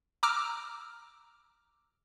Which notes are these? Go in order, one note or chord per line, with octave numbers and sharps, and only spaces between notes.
A#5 D6 E6 F6